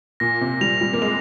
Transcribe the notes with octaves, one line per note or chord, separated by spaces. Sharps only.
A#2 A#6
C3
G3 F7
G3
A#3
G#3 F7